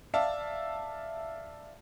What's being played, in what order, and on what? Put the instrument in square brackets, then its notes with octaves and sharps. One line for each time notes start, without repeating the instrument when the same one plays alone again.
[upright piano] D5 E5 F5 A5